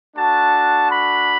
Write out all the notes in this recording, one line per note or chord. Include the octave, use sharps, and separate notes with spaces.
A3 D4 F#4 A5
B5